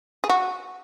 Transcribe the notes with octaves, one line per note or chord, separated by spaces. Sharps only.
G#4
F#4